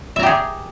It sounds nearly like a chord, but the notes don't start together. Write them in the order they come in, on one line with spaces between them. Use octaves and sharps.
E5 A#5 G4 G#4